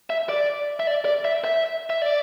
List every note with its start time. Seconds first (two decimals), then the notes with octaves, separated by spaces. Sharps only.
0.10 E5
0.29 D5
0.80 E5
0.87 D5
1.05 D5
1.25 E5
1.44 E5
1.90 E5
2.02 D5